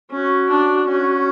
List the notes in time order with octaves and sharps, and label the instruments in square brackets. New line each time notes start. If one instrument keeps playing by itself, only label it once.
[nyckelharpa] C#4 [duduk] F#4
[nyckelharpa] D4
C#4